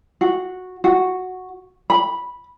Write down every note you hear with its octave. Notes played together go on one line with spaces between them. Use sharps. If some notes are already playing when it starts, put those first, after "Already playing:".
F#4
F#4
B5